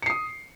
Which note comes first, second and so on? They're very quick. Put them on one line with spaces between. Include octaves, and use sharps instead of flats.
C#7 C7 D#6